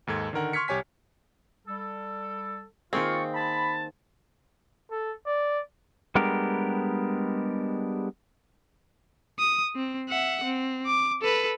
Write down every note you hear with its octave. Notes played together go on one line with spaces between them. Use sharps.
D#2 G#2 A4 G#6
D3 D#3 A#4 F#5
C6 C#6 F6 G#6 B6 C#7
C2 G4 C#5 G#5 B6
G3 A4
D#3 A#3 C4 F4 G#4 C#6
A5 B5
A4
D5
G3 G#3 B3 D4 G4 A#4
D#6
C4
E5 F#5
C4
D6
A4 B4